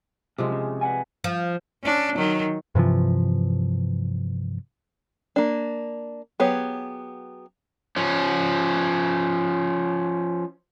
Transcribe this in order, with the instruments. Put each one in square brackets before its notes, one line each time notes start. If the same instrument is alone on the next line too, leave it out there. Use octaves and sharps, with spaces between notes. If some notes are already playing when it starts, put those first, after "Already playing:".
[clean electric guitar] F#2 [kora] C3 F3 G#3
[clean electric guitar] C#3
B4 F#5 G#5
[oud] F3
[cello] C#4 D4
D#3 F#3
[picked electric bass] G2 C3 E3 F3
[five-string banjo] A#3 D4
F#3 B3 G4 G#4 C#5
[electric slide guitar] F3 C#4